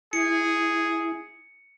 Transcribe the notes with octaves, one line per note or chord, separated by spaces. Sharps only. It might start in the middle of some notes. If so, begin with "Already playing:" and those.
E4 G#4 C#7